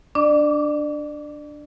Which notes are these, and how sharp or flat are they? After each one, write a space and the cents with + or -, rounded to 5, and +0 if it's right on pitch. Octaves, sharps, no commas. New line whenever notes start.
D4 +0 D5 +30 D6 -40